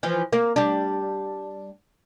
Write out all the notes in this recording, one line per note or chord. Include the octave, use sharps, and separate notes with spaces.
E3 F3
A#3
G3 D4